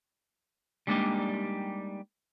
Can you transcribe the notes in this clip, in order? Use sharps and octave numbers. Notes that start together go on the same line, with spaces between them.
G3 G#3 A#3 D4 D#4 G4